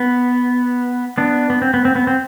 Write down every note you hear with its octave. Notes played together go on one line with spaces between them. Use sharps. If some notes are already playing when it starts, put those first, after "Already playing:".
Already playing: B3
B3 D4
B3
C4
B3
C4
B3
C4